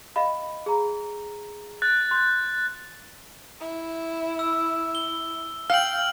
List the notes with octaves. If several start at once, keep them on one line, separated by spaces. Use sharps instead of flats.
D#5 F5 B5
G#4 A#5
F#6 A6
C6 G6
E4
E6
G7
F5 G5 F6 F#7